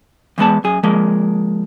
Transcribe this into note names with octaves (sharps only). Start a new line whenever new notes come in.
E2 G#3 B3 A5
F#2 G#4
F3 G#3 A#3